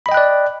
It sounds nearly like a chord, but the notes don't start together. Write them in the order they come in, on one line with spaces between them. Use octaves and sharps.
B5 D#5 G5 F#6 D5